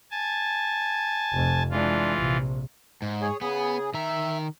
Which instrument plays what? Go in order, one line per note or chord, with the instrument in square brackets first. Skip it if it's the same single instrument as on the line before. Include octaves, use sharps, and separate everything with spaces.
[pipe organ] G#5 A5
[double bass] F1 F2
[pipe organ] E3 F4 [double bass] G#3 D4
[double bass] A#1 C3
[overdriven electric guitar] G#2
[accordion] G#4 C#5
[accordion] C#3 G#4 [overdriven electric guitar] B3
[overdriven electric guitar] D#3 A#5 [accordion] E5